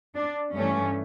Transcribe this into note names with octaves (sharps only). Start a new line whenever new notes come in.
D4
G2 E3 A3 C#4